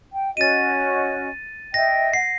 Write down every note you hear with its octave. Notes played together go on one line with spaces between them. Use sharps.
G5
C#4 F#4 D#5 A6 D#7
D#5 E5 G5 A#6
F#5 C7